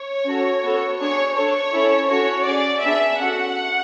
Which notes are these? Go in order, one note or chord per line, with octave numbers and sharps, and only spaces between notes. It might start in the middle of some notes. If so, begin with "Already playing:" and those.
Already playing: C#5
C#4 F#4 A4
B3 F#4 A4
D4 G#4 C#5
D4 A4 C#5
C#4 E4 A4
C#4 F#4 A4 C#5
C#4 G#4 D5
B3 D4 G#4 E5
C#4 F#4 A4 F#5